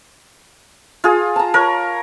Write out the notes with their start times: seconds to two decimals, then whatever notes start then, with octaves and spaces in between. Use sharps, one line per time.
1.04 F4 G#4
1.36 A5 A#5
1.54 A#4 C#5